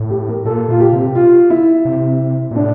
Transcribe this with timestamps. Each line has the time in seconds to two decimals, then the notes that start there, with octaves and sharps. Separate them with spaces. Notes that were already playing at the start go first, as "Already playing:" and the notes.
Already playing: A2
0.10 G4
0.28 A#4
0.45 A#2 A4
0.69 A#2 F4
0.80 G4
0.93 C3
1.07 G4
1.15 F4
1.50 E4
1.85 C3
2.51 A#2
2.56 A2 D4